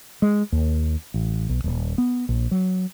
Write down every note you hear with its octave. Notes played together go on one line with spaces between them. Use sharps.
G#3
D#2
A1
B1
D#1
B3
A#1
F#3